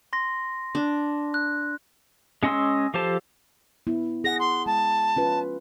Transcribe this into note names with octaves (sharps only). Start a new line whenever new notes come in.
C6 A#6
D4
F#6
G#3 C#4 D#5 C6 E6
F3 G4 A4 C5 A5
B3 E4
G#4 F#5 A#6
C6
G#3 A5
C#4 F4 B4